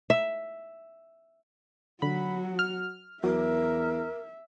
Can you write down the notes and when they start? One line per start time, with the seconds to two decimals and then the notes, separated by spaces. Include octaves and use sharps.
0.10 E5
2.02 D3 F#3 F#4 B5
2.59 F6
3.24 E2 F#3 A#4 E5